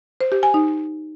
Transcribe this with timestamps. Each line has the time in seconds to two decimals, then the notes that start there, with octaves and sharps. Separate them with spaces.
0.21 C5
0.32 G4
0.43 G#5
0.54 D#4